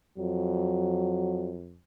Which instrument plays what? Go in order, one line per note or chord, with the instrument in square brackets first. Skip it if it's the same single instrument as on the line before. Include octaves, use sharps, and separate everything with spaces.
[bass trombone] F2 [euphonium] F#3